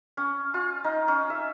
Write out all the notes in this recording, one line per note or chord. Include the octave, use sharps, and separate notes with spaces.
C#4
F4
D#4
C#4
E5